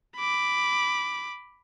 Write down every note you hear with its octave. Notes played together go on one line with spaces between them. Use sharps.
B5 D6